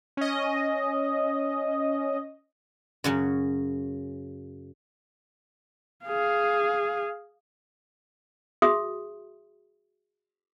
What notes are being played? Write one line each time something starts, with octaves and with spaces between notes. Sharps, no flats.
C#4 D#5
F#2 C#3 F#3
G#4 F5
F#4 G#4 E5 C6 D#6